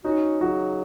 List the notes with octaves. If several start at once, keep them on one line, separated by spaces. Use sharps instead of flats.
C#4 D#4 F#4
C#3 F#3 F#4